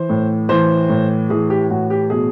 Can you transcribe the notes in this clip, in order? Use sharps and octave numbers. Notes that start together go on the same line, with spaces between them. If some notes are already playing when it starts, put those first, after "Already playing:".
Already playing: E3 C5
A2
E3 C5
A2
E3 G#4
G4
A2 F#4
G4
B2 G#4